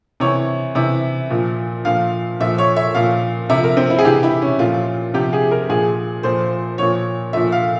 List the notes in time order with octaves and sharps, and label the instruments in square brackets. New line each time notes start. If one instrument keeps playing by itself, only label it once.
[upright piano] C3 E3 C#5
C3 E3 E5
A#2 F3
A#2 F3 F5
A#2 F3 E5
C#5
E5
A#2 F3 F5
C3 F3 E5
A#4
C4
E4
G#4
C3 E3 G4
E4
C#4
A#2 F3 F4
C3 F3 G4
G#4
A#4
A#2 F3 G#4
A#2 F3 C5
A#2 F3 C#5
A#2 F3 E5
F5